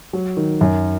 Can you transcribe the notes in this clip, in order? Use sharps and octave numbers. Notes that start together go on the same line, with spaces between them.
F#3
D#3
F#2